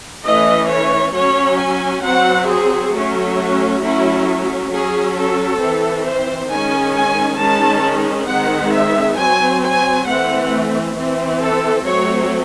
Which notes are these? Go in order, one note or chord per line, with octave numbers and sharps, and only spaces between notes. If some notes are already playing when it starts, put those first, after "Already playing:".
E3 A3 C#4 D#5
C#5
F#3 C#4 C#5
G#5
F#3 C4 F#5
G#4
F#3 A3 C#4
F#4
F#3 A3 C#4 E4
F#3 C#4 G#4
A4
E3 C4
C5
D#3 G#3 C#4 G#5
G#5
D#3 G#3 C#4 A5
D#3 G#3 C4 F#5
E5
F#3 C4 G#5
G#5
E3 A3 C4 F#5
E3 C4
A4
F#3 A3 C4 C#5